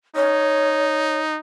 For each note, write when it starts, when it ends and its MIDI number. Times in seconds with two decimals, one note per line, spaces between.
0.16 1.40 63
0.16 1.19 73